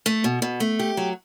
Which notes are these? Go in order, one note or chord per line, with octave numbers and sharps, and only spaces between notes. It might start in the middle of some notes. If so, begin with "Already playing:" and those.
A3
B2
B2
A3
G4
F#3